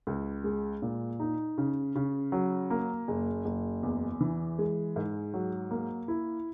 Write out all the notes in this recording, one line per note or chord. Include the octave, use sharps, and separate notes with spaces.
C#2
G#3
A#2
D#4
C#3
C#3
F#3
A#3
F#1
F#1
E2
E3
G#3
G#2
F#3
A#3
E4